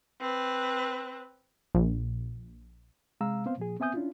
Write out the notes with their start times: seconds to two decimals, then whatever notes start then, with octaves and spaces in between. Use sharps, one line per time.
0.21 C4 B4
1.75 A#1
3.21 C3 G#3 F5 A#5 E6
3.46 B3 C4 C5 F5
3.58 A#2 F3 G#4
3.80 B3 C4 E5 G#5 D#6 G6
3.94 C#4 D4 E4 F4